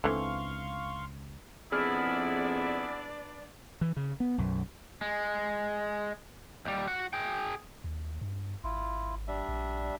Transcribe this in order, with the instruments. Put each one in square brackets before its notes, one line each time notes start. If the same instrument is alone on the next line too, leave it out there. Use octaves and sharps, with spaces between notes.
[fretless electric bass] C#2 G#3 C4 [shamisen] D3 E3 [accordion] F5 C6 C#6
[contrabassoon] F2 [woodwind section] B3 E4 [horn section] D4 B4 D5 [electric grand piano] G#4 F6
[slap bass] E3
C#3
B3
B1 F#2
[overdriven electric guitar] G#3
D#2 G3
F#4 F#5
G#4 G5
[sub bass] D#2
G2
[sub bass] G#1 [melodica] E4 F4
[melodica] G3 D4 E5
[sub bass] A#1